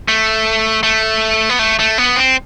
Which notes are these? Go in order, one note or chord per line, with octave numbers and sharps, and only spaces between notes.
A3
A3
B3
A3
A3
B3
C4